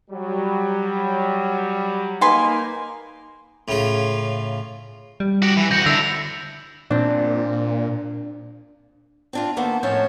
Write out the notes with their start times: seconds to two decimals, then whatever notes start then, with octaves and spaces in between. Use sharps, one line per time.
0.11 F#3 G3
2.21 A#3 D#4 B4 G#5 C6
3.68 A2 C#3 F4
5.20 G3
5.42 F#4 G4
5.57 E3
5.71 C2 F#4 G6 A#6 C#7
5.86 D3 D4 E4 E6 F7
6.90 A#2 C4 D4
9.33 C4 D4 F4
9.56 D#3 A#3 B3 A4 C5
9.83 F2 A2 C#4 C5 C#5 A5